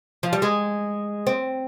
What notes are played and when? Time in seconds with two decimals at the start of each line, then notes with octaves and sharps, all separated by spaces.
0.23 F3
0.33 G3
0.42 G#3
1.27 C4